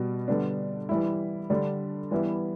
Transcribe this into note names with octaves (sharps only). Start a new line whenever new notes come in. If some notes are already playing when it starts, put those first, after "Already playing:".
Already playing: B2 G3 B3
D3 G3 B3 D4
E3 G3 E4
D3 G3 D4
E3 G3 B3 E4